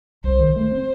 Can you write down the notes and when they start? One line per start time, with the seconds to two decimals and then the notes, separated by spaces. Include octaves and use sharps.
0.24 C2 C5
0.39 D#3
0.56 A3 C5
0.72 C4